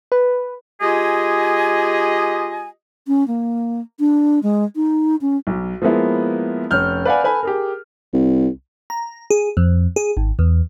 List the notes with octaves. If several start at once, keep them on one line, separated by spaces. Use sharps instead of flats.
B4
G#3 F4 G4 G#4 D#5 G#5
C#4
A#3
D4
G#3
D#4
C#4
B1
F3 G#3 A#3 B3 E4
F1 C#4 F6 G6
B4 D5 F5 F#5 G#5
A4 B4 G#5 B5
G4 G#4 A#4
C2
A#5
G#4
F2
G#4
G#1
E2